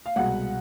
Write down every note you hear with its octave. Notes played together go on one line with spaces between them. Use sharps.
F5
C2 B2 G#3 F#5